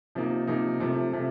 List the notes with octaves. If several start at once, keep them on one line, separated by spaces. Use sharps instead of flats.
C3 F3 A#3 D#4
C3 F3 A#3 D#4
C3 F3 A3
C3 F3 A3